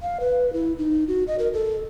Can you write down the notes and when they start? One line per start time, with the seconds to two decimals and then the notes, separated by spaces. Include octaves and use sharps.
0.02 F5
0.20 B4
0.53 E4
0.78 D#4
1.08 F#4
1.28 D#5
1.39 A#4
1.53 A4